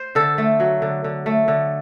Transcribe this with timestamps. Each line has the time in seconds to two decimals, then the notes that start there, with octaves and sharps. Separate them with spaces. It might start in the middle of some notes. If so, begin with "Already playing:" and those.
Already playing: C5
0.15 D3 A4
0.38 A3
0.60 F#3
0.82 D3
1.04 D3
1.26 A3
1.48 D3